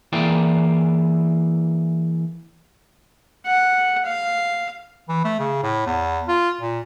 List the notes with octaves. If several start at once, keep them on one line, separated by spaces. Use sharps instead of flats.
E3 A#3 E4 G#4 D5 G5
F#5
F5
E3
A3
C#3
A2
E2
F4
A#2